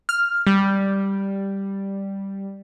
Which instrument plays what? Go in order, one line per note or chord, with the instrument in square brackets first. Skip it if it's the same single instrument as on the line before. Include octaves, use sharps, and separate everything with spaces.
[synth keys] F6
G3